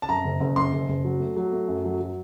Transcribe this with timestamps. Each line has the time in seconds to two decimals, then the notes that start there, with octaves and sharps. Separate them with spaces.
0.02 A5
0.09 F#2 A#5
0.24 F#1
0.40 F#1
0.56 F#2 C6
0.73 F#1
0.88 F#1
1.04 F#3
1.20 A3
1.36 F#3
1.52 A3
1.68 F#2
1.85 F#3
2.00 F#3